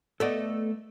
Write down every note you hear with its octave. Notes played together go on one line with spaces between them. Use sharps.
A3 B3 A4 D5 D#5